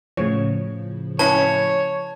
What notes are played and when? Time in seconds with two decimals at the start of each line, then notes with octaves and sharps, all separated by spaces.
0.17 A2 C#3 F3 C#5
1.19 C#4 E4 B4 C#5 A5